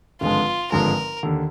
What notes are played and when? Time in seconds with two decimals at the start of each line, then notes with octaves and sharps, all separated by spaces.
0.21 G#1 G2 D3 F3 G#3 F4
0.72 G#1 G2 D3 F3 G#3 A#4
1.23 D#2 D3